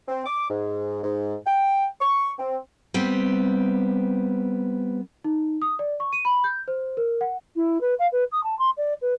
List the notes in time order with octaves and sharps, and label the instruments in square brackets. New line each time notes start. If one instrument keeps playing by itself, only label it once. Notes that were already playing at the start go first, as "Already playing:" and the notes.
[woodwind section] C4
D6
G#2
G#2
G5
C#6
C4
[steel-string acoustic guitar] G3 B3 C4
[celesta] D#4
D#6
D5
C#6
D#7
B5
G6
C5
A#4
F#5
[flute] E4
B4
F5
B4
D#6
A5
C6
D5
B4